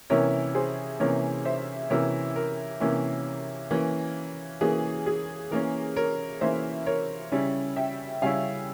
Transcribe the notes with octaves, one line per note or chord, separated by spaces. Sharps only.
C3 E3 A#3 C#4 E4 A#4 C#5
G#4 C5
C3 E3 A#3 C#4 E4 A#4 C#5
C5 E5
C3 E3 A#3 C#4 E4 A#4 C#5
A#4
C3 E3 A#3 C#4 E4
E3 A#3 C#4
E3 A#3 C#4 G#4
G#4
E3 A#3 C#4 A#4
A#4 C#5
E3 A#3 C#4 C5 E5
A#4 C#5
C#3 G3 C#4 E4
E5 G5
C#3 G3 C#4 E4 F5 G#5